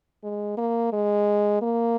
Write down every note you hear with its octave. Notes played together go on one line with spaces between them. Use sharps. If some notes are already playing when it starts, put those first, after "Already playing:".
G#3
A#3
G#3
A#3